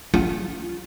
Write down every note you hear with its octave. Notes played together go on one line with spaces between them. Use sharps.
F4